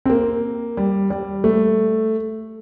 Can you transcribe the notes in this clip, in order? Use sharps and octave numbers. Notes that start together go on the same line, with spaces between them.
C4
A#3
G3
G3
A3